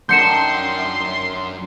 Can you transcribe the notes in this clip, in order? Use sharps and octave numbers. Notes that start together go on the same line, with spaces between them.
F#2 D3 D#3 A#4 C6 G6 C#7 E7